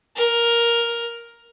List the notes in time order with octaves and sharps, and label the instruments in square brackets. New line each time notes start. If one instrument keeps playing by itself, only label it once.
[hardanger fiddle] A#4